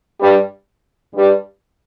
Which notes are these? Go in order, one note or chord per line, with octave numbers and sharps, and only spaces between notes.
G2 G3
G2 G3